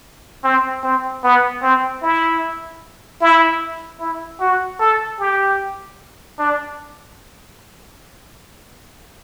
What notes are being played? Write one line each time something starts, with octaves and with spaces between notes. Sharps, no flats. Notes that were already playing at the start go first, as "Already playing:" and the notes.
C4
C4
B3
C4
E4
E4
E4
F#4
A4
G4
D4